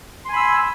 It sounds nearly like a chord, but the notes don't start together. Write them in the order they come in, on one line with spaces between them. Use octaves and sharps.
C6 G#5 B5 E6